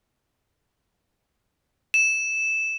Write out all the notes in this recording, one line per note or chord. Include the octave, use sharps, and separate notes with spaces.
E7